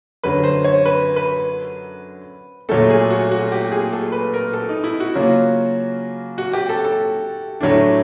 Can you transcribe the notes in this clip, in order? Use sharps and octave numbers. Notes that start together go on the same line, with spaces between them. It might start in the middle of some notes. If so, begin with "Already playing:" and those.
F#2 D3 F#3 B4
C5
C#5
B4
B4
A#2 F#3 A3 A4
G#4
F#4
F#4
G4
G#4
A4
B4
A#4
A4
D#4
E4
F#4
C#3 F#3 A#3 C#4 F4
F#4
G4
A4
A4
A2 F#3 A3 D4